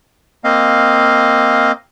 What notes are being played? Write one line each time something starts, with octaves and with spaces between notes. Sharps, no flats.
A#3 C4 D#5 F5